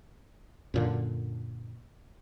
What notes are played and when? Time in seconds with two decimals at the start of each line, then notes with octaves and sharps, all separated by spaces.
0.74 F#2 A#2 D3